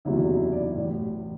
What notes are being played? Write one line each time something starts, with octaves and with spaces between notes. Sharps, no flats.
F#1 E2 C3 F#3 E4
F#4
E4
F#4
D5
D5
A1 A2 E3